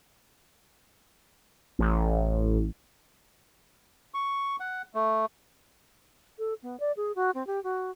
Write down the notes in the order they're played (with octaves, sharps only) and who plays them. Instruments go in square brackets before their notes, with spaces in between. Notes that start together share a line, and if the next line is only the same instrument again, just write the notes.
[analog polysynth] A1
[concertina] C#6
F#5
A3
[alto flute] A4
B3
D5
G#4
F#4
C4
G4
F#4